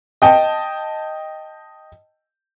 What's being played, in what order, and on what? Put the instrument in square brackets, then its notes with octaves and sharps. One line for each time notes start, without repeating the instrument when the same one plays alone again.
[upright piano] D#5 G5 A5